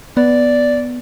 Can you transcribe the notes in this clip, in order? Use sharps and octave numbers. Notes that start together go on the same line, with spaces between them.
B3 D5